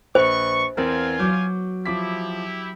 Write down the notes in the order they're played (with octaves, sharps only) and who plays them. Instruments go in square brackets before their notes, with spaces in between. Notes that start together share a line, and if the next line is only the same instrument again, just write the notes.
[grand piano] A#1 B4 [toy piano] C5 [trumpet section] C#6
[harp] E2 [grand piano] C4 A#4 [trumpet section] F4 G#5
[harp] F#3 [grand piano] D6 G6
[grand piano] F3 D6 B6 [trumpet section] E4 G4